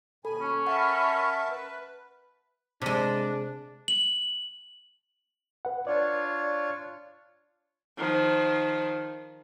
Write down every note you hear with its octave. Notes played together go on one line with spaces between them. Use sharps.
D#2 B2 A4 G#5 B5
C#4
A#4 E5 F#5 A5
B4
C3 G#3 D4
F#7
B4 F#5
D4 F4 C#5 D5
D#3 F3